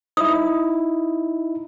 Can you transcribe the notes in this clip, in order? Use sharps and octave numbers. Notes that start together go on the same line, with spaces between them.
D#4 E4 D#6